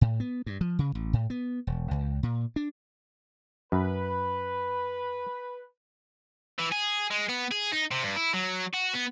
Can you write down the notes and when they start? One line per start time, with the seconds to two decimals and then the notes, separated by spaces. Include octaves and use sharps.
0.01 A2
0.20 B3
0.46 G2
0.61 F3
0.79 C#3
0.95 A1
1.13 A2
1.30 B3
1.67 E1
1.91 C#2
2.23 A#2
2.56 D4
3.72 F#2 B4
6.58 E3
6.72 G#4
7.11 G#3
7.29 B3
7.52 G#4
7.72 D#4
7.91 C3
8.03 G2
8.16 E4
8.34 F#3
8.74 F#4
8.94 B3